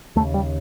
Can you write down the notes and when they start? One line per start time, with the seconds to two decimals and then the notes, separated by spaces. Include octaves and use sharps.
0.16 D#2 A3
0.20 C#3
0.34 G3